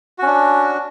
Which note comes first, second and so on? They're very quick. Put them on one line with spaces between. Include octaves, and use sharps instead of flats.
F#4 C#4 D4